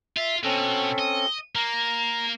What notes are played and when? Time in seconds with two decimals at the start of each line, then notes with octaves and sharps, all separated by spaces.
0.17 F4 E5
0.44 B2 C4 C#4 A4
0.99 D#5
1.55 A#3 A#5